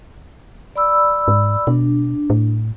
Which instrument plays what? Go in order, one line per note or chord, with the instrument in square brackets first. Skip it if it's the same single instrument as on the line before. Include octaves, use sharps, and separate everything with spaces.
[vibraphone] D5 B5 E6
[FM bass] G#2
[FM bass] B2 [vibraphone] D4
[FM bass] A2